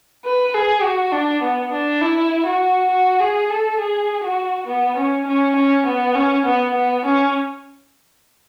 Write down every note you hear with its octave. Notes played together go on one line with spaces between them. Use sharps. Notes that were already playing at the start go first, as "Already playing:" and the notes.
B4
G#4
F#4
D4
B3
D4
E4
F#4
F#4
G#4
A4
G#4
F#4
B3
C#4
C#4
C#4
B3
C#4
B3
B3
C#4